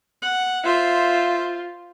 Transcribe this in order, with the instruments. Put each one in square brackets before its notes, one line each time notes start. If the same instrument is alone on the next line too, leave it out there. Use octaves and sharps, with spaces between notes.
[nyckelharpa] F#5
[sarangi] F4 [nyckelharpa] C5 E5